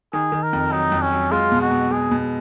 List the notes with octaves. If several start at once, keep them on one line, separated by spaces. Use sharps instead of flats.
D#3 G#4
D#3
A#4
F2
F#3 D#4
F2
C#4
F#3
G#3 F4
B2
F#4
B2
G#3 G#4
B2